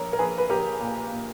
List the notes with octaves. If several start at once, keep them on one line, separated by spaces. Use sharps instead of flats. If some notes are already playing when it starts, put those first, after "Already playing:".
Already playing: A#1 A#4 C#5
A#4
A#1 G#4 B4
B4
A#1 G4 A#4
A#2
A#2